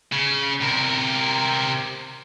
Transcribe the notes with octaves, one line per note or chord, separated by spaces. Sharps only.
C#3
C3 A#4